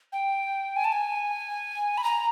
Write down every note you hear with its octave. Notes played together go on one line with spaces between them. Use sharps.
G5
G#5
A5
G#5
B5
A#5